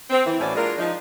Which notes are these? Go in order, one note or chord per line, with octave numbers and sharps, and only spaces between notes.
C4
E3
A2 E3 C#4 E4 F#4 D5
G#3 A#3 D4 F4 A#4
F3 D4 D#4